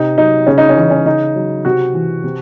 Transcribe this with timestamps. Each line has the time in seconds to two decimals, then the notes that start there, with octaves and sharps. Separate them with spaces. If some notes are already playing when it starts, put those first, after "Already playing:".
Already playing: C3 D#4
0.18 F#3 D#4
0.46 C#3 C#4
0.58 D#4
0.69 C#4
0.76 E3 D#4
0.90 C#4
1.05 C#3 D#4
1.36 F#3
1.65 C3 F#4
1.94 E3
2.24 C3